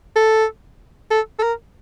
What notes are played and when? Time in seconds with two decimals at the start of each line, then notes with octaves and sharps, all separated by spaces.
0.16 A4
1.11 A4
1.39 A4
1.43 A#4